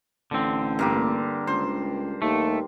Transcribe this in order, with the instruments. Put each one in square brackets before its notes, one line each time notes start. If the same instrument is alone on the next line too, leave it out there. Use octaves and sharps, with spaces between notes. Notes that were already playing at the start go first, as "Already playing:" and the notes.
[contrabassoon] A1 [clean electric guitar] D3 C4
[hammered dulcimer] G2 A#3 G4
[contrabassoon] C#2 [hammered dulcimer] C5
[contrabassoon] D#2 [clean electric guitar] A3